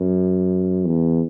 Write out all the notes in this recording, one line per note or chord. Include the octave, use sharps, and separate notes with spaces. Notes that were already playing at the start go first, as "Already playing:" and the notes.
Already playing: F#2
E2